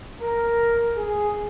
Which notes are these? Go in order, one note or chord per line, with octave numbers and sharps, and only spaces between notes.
A#4
G#4